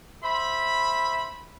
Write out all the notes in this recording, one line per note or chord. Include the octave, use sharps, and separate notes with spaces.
C5 E5 B5